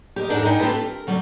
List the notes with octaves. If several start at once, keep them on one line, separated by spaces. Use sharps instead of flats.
G4 A#4 D#5
E2 G#2 D4 D#4 A4 A#4
D#4 A#4 B4 D#5 G5 G#5
C4 F4 G4 A4 B4
A#4
D2 F#3 G3 D5